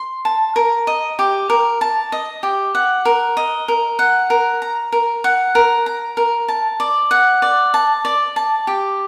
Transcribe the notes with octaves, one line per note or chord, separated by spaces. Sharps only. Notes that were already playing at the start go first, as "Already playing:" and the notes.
Already playing: C6
A5
A#4
D#5
G4
A#4
A5
D#5
G4
F#5
A#4
D#5
A#4
F#5
A#4
A#5
A#4
F#5
A#4
A#5
A#4
A5
D5
F#5
D5
A5
D5
A5
G4